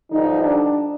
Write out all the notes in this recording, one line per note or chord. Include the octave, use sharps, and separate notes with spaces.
G2 D3 F3 D#4
D4